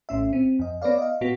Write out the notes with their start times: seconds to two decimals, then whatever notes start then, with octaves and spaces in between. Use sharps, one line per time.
0.09 A#1 A2 C#4 E5
0.33 C4
0.59 F2 D#5
0.82 B3 B4 C#5 D5 F5
0.98 D#5 F5
1.21 A#2 B3 F#4 B6